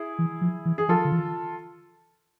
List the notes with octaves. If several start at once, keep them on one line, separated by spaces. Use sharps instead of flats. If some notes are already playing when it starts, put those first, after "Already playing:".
Already playing: E4 G#4
E3
F3
E3
G#4
F3 F4 A4
D3
E3